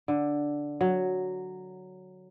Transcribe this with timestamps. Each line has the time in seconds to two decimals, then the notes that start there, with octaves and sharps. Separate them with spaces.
0.08 D3
0.81 F#3